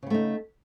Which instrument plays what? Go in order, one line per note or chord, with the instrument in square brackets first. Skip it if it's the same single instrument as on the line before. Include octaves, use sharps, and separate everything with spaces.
[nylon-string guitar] C#3
B3
A3
D#4